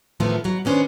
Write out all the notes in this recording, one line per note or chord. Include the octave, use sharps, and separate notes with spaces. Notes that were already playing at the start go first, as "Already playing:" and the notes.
A2 C3 D#3 F3 A3 B3
B2 F#3
D#3 B3 C#4 D4 C5